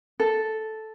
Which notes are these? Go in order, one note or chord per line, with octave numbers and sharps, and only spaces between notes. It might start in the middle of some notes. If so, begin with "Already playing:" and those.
A4